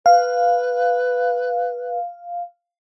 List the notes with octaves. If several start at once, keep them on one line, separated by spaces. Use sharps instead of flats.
B4 F5